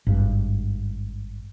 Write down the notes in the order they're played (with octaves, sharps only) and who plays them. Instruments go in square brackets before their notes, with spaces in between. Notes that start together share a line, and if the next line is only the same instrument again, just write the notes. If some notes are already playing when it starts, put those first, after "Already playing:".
[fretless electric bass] G#1 G2